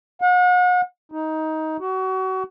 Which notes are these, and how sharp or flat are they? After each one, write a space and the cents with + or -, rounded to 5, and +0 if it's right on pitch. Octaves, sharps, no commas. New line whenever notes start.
F#5 -40
D#4 +15
F#4 +30